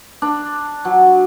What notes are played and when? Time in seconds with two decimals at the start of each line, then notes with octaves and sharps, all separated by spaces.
0.22 D4
0.85 F#3